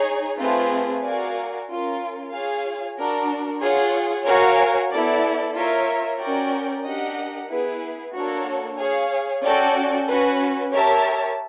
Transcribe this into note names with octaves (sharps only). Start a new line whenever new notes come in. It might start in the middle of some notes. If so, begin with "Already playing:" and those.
Already playing: D#4 G#4 C#5
A3 C4 F4 G#4 B4
F#4 A#4 D5 F5 G#5
C#4 F4 A#4
F4 G#4 C#5 F5 G#5
D4 F#4 A#4
F4 G#4 C#5 F#5
F#4 A#4 C#5 F5 G#5
B3 E4 A4 D5
F4 A#4 C#5 E5
C#4 F#4 A#4 D5 G5
D4 G4 A#4 D#5 F#5
B3 E4 G#4 B4
A#3 D4 F#4 A4 C#5
G#4 C#5 F5
C#4 F#4 A4 D5 G5
C#4 F#4 B4
G4 A#4 C#5 E5 A5